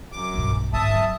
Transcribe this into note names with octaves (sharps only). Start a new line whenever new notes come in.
F#2 D6
B1 G2
G#1 A2 E5 A5 D#6
E3 F#3